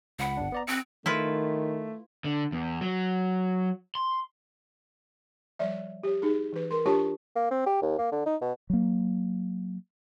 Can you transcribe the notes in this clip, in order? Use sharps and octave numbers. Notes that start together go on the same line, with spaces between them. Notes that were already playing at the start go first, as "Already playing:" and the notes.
C#2 F#5 B5
G1 D4
B3 D5 A#5
C4 F#6 C#7
D#3 A3 E4 F4 B4
D3
E2
F#3
C6
F3 G3 D5 E5
G4 C#5
D#4 G#4
E3 B4
A#4 C6
D4 F4 G4 C#5 A5 C#6
A#3
C4
G4
D#2
A#3
D3
D#4
B2
F#3 A#3